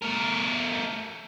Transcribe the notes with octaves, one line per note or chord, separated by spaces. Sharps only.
A3 A#4